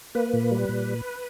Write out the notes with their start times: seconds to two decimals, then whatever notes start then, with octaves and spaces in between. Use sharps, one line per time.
0.15 A#3 B4
0.33 A#2
0.51 G3
0.69 A#2